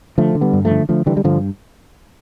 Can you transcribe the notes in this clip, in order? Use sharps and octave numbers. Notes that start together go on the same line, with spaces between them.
D3 F3 A3
D3
G3 B3
G2
F3 A3
D3
D3 F3 A3
D3 E3 G3
G3
G2 D3 F3